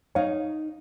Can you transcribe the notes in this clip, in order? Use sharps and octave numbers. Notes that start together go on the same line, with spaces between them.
D#4 C#5 F5